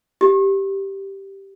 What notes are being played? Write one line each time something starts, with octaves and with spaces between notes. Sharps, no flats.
G4